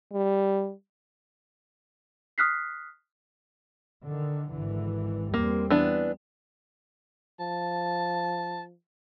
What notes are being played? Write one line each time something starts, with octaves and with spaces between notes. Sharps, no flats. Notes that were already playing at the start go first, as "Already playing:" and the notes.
G3
D#6 F6 F#6 B6 C7
D3 D#3
G#1 D3 E3
E2 G3 A#3 C4
E3 B3 D4
F3 A5